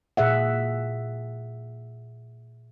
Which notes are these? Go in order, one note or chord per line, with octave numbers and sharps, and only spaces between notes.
A#2 G#4 E5 F#5